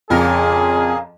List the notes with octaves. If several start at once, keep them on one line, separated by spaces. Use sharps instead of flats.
F2 A#2 C#3 G#4 A#4